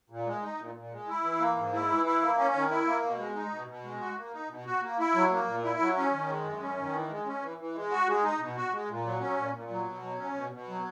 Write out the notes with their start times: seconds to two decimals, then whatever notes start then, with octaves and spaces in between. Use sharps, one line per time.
0.10 A#2
0.26 G#3
0.42 D#4
0.58 A#2
0.75 A#2
0.91 G#3
1.07 E4
1.24 E3
1.40 A#3
1.56 G#2
1.73 E4
1.88 E3
2.05 E4
2.21 A#3
2.38 C#4
2.54 D#3
2.70 E4
2.86 A#3
3.03 B2
3.19 G#3
3.35 D#4
3.51 B2
3.68 B2
3.84 G#3
4.00 F#4
4.17 A#3
4.33 D#4
4.49 B2
4.65 F#4
4.82 A#3
4.98 E4
5.14 F#3
5.30 A#3
5.47 A#2
5.63 E4
5.79 F#3
5.96 C#4
6.12 D#3
6.28 G#3
6.44 F#2
6.60 C#4
6.77 D#3
6.93 E3
7.09 G#3
7.26 C#4
7.42 E3
7.58 E3
7.75 G#3
7.91 F#4
8.07 G#3
8.23 D#4
8.40 B2
8.56 F#4
8.72 G#3
8.88 A#2
9.05 F#3
9.21 C#4
9.37 A#2
9.54 A#2
9.70 F#3
9.86 B2
10.02 F#3
10.19 C#4
10.34 B2
10.52 B2
10.68 F#3